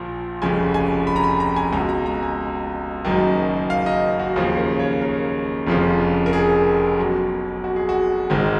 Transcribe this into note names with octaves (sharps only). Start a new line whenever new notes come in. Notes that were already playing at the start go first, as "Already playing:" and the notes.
Already playing: A#1 A#2 F3
F1 F2 C#3 G#5
G#5
B5
A#5
B5
A#5
G#5
C#2 B2 A#5
A#5
A#5
G#5
F#1 F#2 D#3
F5
D#5
F#4
D#2 C#3 F3 G#4
A#4
C#5
A#4
F1 F2 C#3 F3
A#4
G#4
B1 B2
F#4
G#4
F#4
G#1 G#2 D#3